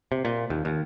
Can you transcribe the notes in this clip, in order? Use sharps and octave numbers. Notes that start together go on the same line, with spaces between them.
C3
A#2
D#2
D#2